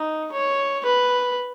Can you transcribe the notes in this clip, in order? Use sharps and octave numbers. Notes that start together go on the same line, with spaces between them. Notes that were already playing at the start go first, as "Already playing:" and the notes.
Already playing: D#4
C#5
B4